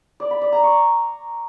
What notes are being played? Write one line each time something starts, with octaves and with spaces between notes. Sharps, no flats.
D5
B5
D5
A#5
C#6